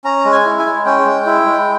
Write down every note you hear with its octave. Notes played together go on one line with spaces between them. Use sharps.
C#4 A#5
G#3
G#5
E4
G#5
G#3
C#4 G5
G#3
E4
G#3